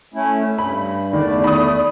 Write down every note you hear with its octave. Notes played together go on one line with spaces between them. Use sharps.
A3 C#4 E4
G2 B5
E2 D#3 A3 D5
B5 D#6